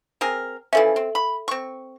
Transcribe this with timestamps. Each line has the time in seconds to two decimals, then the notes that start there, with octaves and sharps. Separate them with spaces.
0.21 C4 G#4 A#4
0.73 E3 F3 C#4 A4 E5
0.96 C4
1.15 B5
1.48 C4 C#6